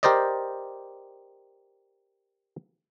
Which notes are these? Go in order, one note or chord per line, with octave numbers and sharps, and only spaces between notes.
G4 A#4 C5 D5 D#5